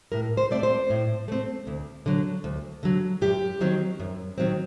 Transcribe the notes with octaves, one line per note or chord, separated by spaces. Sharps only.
A2 A#4
C5
A3 C4 D5
C5
A2
A3 C4
D2
D3 F#3
D2
D3 F#3
F#2 G4
D#3 F#3 C4
F#2
D#3 F#3 C4